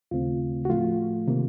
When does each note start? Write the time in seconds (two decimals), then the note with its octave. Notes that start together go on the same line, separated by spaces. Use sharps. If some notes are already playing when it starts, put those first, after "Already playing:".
0.11 D#2 C#3 A3 C4 F4
0.65 F#4
0.69 A2 F3 A3 F4
1.27 C3 D#3 A#3